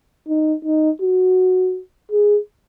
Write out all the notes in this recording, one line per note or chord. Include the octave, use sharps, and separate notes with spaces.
D#4
D#4
F#4
G#4